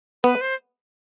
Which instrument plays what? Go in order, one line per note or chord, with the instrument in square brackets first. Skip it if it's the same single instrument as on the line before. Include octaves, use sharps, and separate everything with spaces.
[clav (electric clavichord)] B3 [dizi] B4
[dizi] C5